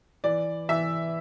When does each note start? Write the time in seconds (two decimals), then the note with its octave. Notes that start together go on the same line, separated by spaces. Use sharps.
0.24 E3 D5
0.69 E3 E5